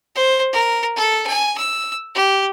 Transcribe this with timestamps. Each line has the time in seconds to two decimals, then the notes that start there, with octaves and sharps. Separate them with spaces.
0.15 C5
0.53 A#4
0.96 A4
1.26 G#5
1.58 E6
2.15 G4